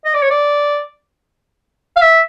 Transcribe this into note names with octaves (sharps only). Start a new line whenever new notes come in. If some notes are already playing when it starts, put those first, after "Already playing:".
D#5
D5
C#5
D5
F5
E5